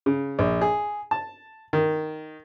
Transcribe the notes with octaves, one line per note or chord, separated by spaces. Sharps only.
C#3
A#1
G#4
A5
D#3